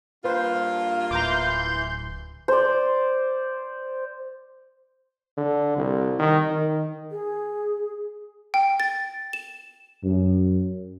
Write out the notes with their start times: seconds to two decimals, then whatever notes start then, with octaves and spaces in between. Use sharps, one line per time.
0.24 G2 A#3 F4 B4 C5
1.11 D1 E3 A#5 C6 D6 G6
2.48 C5 D5
5.37 D3
5.77 C2
6.19 D#3
6.51 D#3
7.11 G#4
8.54 G5
8.80 A6
9.33 E7
10.04 F#2